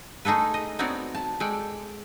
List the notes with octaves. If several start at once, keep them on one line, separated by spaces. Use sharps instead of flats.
A3 D#4 G#4 A4 B4
D#5
B3 C4 D#4 F#4 C#5 D5
A5
G#3 A4 D5 G5